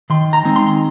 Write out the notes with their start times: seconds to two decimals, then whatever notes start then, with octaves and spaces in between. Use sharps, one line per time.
0.10 D#3 C6
0.33 A#5
0.45 G#3 C4 D#4
0.56 C6